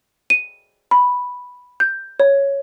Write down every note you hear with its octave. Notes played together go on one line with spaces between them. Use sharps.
D#7
B5
G6
C#5